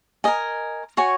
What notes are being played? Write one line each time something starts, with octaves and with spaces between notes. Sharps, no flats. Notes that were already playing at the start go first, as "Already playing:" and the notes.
A#4 D#5 G#5
F#4 C#5 G#5